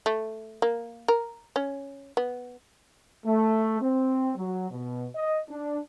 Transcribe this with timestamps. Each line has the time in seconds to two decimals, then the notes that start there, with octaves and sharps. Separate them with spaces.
0.06 A3
0.62 A#3
1.08 A#4
1.56 C#4
2.17 B3
3.26 A3
3.81 C4
4.35 F#3
4.71 B2
5.14 D#5
5.49 D4